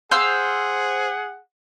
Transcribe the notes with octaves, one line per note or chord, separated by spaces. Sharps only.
G#4 C5 F5 F#5 E6